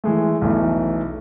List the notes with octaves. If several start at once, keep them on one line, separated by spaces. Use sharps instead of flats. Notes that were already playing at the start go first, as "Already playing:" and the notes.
E3 G#3 A3
B1 E2 E3 A3